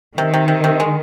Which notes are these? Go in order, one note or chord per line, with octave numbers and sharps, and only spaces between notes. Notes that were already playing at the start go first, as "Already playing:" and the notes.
C3 D#3
C3
C3
C3
G#3